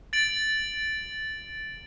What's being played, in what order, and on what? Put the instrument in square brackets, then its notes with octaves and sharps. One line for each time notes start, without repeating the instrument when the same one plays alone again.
[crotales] A6 D7 F#7